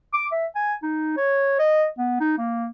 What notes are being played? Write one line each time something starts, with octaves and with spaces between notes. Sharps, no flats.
D6
E5
G#5
D#4
C#5
D#5
B3
D#4
A#3